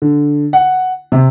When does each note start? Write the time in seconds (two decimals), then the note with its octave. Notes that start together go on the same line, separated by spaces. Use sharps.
0.02 D3
0.53 F#5
1.12 C3